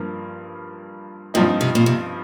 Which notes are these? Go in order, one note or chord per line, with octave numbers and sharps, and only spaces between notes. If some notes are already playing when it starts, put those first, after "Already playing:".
Already playing: G2 F3 A#3
G2 A#2 F3 C4 D#4
C3
A#2
C3